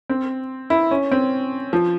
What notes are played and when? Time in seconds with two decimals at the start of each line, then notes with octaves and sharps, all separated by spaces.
0.09 C4
0.70 E4
0.91 C#4
1.12 C4
1.73 F3